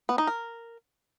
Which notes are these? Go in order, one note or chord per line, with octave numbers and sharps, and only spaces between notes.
B3
D#4
A#4